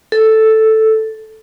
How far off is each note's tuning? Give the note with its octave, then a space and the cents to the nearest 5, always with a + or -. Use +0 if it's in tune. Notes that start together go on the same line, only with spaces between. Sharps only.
A4 +0